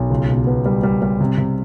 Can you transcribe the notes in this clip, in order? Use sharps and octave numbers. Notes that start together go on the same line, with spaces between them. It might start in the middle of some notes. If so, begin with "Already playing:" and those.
Already playing: B1
C#2
B2
B3
G3
G3
G3
C3
C3